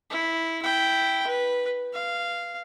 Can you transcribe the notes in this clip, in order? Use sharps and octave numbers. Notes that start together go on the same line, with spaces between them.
E4
E4 G5
B4
F5